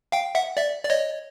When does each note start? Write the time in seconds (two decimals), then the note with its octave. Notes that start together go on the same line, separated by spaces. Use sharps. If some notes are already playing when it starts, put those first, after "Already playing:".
0.12 F5 G5
0.35 E5 F#5
0.57 D5 E5
0.85 D5
0.90 C#5 D#5